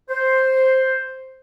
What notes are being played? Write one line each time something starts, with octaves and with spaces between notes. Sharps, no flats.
C5